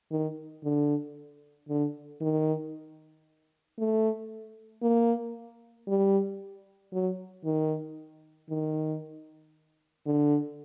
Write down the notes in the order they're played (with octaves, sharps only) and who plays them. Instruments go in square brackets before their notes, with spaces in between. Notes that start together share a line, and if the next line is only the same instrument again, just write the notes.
[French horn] D#3
D3
D3
D#3
A3
A#3
G3
F#3
D#3
D#3
D3